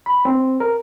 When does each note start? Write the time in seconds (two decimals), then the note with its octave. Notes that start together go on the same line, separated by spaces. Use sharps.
0.06 B5
0.25 C4
0.60 A#4